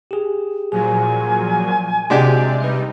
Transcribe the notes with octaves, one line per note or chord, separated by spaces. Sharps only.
G4 G#4
A#2 F3 F#3 G#4 G#5
C3 G#3 D4 F#4 G4 D5
C3 G3 D#4 B4 E5